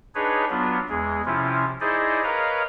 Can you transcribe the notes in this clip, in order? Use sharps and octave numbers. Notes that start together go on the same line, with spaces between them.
D4 D#4 G#4 B4 C#5
F#3 B3 D4 F4
E2 G#3 G#4
C3 F3 C#4 E4 F4
D#4 E4 G#4 C5 D5 D#5
A#4 B4 C#5 D#5 F5 A#5